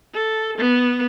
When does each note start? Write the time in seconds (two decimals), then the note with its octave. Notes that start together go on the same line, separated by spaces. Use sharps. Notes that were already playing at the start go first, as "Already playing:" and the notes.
0.14 A4
0.58 B3